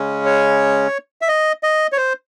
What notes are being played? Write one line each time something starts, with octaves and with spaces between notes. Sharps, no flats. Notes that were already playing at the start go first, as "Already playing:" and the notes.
Already playing: C#3 G#3 C#4
C#5
E5
D#5
D#5
C#5
C5